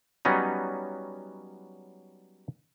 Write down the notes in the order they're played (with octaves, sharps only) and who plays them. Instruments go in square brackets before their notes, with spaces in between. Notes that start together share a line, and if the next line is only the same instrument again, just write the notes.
[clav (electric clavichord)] F#3 G3 B3 C#4 D#4